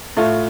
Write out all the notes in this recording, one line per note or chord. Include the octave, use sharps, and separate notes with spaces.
A2 A3 F4